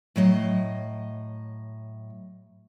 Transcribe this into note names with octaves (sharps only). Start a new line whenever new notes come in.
A2 F#3 D#5